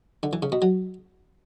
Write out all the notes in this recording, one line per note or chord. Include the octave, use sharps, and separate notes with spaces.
D3
E3
C#3
B2
F#3